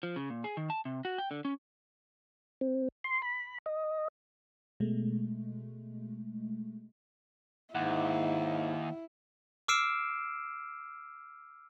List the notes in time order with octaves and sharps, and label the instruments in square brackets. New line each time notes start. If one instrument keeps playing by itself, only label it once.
[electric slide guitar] F3
C#3
A#2
G#4
D#3
A5
C3
F#4
G5
D3
C#4
[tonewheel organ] C4
C6
B5
D#5
[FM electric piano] B2 G#3 A3
[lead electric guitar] D#2 [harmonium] G#2 [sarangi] E4 [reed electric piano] F#5
[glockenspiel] D6 E6 F6 C7 D7 E7